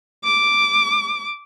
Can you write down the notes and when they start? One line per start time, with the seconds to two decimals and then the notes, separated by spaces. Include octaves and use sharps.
0.24 D6